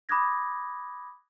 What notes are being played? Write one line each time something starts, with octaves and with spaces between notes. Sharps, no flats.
B5 D6 D#6 F#6 G#6 A#6